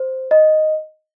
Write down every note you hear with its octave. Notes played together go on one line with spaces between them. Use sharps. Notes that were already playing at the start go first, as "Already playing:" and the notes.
Already playing: C5
D#5